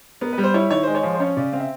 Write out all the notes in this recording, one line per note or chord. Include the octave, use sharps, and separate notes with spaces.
B3 A#4
B4
G3
C5
E4 C#5
D#3 C#5
G#3 C5
C#5
F3
C5
C#4 C#5
C#3 D5
C4 F5
E5